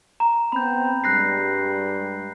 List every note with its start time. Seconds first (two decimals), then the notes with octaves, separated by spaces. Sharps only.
0.20 A#5
0.52 B3 C4 B5 G6
1.04 G2 G3 G#3 F#6 A#6 C7